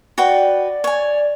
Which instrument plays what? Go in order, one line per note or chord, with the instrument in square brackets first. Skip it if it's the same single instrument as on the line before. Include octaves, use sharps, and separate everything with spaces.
[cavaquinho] F#4 B4 G5 [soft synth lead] D5
[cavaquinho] C#5 G#5